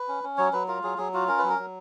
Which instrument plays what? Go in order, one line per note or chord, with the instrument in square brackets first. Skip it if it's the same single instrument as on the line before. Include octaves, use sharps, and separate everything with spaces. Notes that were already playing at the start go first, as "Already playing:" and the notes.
Already playing: [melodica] B4
C#4
C#4
F#3 C#5
F#3 B4
F4 A#4
F#3 G#4
F#3 G#4
F4 F#4
C#4 A#4
B4
F#3
A#4
F#3